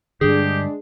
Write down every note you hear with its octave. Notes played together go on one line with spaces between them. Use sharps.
G2 D3 G#3 D4 G4 G#4